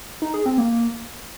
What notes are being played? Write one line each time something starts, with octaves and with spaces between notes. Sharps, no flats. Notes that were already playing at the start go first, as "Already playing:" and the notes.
D#4
G#4
C4
A#3